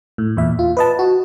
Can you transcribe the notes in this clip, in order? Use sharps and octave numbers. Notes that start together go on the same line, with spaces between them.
A2
E2 A#2 E5
F4
B4 D#5 A5
F#4